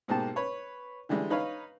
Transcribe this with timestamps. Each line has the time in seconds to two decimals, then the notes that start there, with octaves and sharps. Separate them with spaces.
0.08 G#2 B2 G#3 A#3 G4 A5
0.36 B4 C#5
1.09 D3 E3 G3 G#3 D4
1.30 D#4 B4 C#5 F5